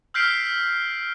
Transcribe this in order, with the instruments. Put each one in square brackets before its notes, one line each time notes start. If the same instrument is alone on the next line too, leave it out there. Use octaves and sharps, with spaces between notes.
[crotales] E6 F6 G6 B6 C7 D7